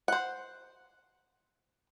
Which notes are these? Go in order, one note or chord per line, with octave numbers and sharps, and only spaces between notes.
C5 F#5